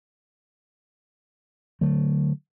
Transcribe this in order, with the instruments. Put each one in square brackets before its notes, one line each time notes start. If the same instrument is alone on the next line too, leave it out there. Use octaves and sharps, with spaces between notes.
[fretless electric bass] D3 F#3 A3